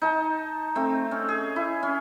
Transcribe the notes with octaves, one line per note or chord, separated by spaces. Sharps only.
D#4 A5
A3 C4
C#4
G#4
E4
C#4